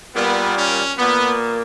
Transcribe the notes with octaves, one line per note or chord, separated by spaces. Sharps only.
A#2 G3 A#3 B3
C#4
A#2 A#3 B3